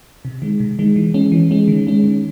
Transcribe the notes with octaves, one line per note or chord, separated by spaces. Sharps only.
C3
D#3 G#3
C3
D#3 G#3
E3
G#3 C#4
E3
G#3 C#4
D#3
G#3 C#4
D#3